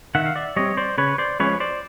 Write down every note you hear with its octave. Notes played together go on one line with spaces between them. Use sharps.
D#3 E5 F#5
F5
D5 E5
G3 C4 C#5 D#5
C5 D5
C#3 B4 C#5
C5 D5
F3 G#3 C#4 B4 C#5
C5 D5